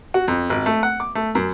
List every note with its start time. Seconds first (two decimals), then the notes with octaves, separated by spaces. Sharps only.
0.14 F#4
0.28 F2
0.50 G#1
0.66 A3
0.83 F#5
1.00 D6
1.15 A3
1.35 F#2